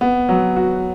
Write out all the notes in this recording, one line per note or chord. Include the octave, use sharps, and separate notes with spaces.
B3
F#3
F#4